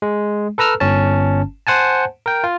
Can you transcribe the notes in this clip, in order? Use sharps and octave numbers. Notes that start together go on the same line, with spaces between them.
G#3
A4 B4 A#5 E6 F6
G1 C#4 A5
C5 F#5 G#5 A5
A#4 G5
F4